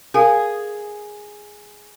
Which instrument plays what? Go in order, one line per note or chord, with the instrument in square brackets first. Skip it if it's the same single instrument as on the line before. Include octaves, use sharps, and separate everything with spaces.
[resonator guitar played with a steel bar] G#4 [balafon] A#4 F5